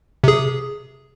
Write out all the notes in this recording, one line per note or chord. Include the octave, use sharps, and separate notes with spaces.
C3 G#4